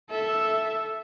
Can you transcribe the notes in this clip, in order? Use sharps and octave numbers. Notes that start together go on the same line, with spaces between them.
A4 E5